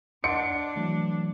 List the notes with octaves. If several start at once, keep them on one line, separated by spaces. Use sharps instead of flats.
D4 D#5 F#5 C6 C#7 D7
E3 F#3 A3